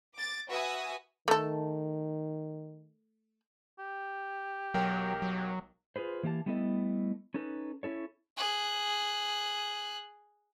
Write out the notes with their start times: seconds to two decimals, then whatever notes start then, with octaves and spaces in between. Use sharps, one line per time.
0.17 D6 A6
0.49 F#4 B4 E5 G#5 D#6
1.28 D#3 A3 A4
3.79 G4
4.74 B1 F#3 A#4 G5
5.22 F#3
5.96 F4 G#4 B4 C5
6.23 E3 A#3 G4 E5 A5
6.46 G3 A3 B3 E4 A4 D#5
7.34 C#4 D#4 A4 B4
7.83 C#4 E4 A4 C#5
8.37 G#4 F#6